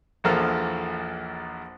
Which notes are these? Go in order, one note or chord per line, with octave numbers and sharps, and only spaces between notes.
A#1 E2 F3 A#3 A4 F6